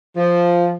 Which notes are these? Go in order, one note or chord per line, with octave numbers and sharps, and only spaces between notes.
F3